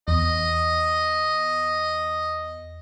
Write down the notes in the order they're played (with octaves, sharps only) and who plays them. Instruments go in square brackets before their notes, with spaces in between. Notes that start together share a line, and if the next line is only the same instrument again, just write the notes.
[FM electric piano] E2 [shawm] D#5